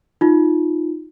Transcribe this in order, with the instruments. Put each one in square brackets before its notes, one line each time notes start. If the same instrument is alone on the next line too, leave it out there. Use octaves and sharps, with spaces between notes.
[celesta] D#4 F4